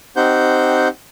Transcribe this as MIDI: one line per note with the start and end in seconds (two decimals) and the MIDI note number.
0.16 0.88 60
0.16 0.88 63
0.16 0.88 67
0.16 0.88 72
0.16 0.88 78
0.16 0.88 91